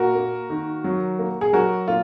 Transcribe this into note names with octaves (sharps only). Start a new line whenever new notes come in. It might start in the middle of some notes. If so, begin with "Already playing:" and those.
Already playing: A#2 F#4 A#4
A#3
D#3
F#3
A#3
G#4
F#3 F#4 A#4
A#3 F4